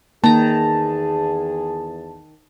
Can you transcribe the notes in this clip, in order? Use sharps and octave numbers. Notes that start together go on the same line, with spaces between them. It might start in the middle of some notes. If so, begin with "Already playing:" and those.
E2 D#3 A#3 G#4 A5 A#5